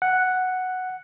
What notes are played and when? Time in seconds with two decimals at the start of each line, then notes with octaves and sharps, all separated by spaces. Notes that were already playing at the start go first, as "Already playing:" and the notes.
0.02 F#5